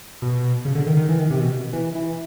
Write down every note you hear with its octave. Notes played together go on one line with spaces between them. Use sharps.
B2
C#3
D3
D#3
D#3
E3
D#3
C3
B2
E3
E3